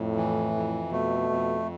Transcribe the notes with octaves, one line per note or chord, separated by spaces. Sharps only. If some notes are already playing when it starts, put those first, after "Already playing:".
Already playing: F2 A2
E3
F2
B2 A3
F2